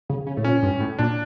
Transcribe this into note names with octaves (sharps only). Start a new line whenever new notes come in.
C#3
C#3
A2
A#2 C#4
G2
A2
A#2 D4